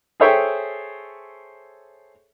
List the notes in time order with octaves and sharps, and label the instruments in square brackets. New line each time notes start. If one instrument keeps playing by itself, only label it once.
[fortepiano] G#4 A4 C5 C#5 E5 G5